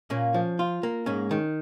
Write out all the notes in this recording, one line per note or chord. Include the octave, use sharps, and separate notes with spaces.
A#2 A#3 C#4
F3
F4
A#3
G#2 G#3 C#4
D#3